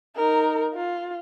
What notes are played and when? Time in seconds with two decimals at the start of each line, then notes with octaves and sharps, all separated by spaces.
0.16 D#4 A#4
0.74 F4